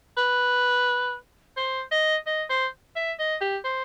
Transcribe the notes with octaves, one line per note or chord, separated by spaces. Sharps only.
B4
C5
D#5
D#5
C5
E5
D#5
G4
C5